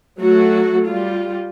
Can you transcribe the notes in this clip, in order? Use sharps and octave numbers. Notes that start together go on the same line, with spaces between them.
F#3 A3 F#4
G3 F4